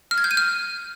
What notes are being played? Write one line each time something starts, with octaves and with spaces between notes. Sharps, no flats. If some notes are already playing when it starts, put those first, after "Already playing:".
F6
G#6
G6
D#7
F6